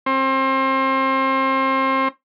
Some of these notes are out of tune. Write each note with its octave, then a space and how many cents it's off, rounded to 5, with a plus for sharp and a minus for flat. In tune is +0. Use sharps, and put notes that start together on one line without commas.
C4 +30